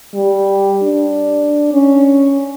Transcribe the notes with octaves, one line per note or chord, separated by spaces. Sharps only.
G3
D4
C#4